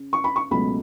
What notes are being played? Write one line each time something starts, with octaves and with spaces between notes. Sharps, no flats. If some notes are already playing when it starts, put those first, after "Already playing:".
Already playing: C#3
C#6
B5
C#6
C#2 B2 F#3 A3 B5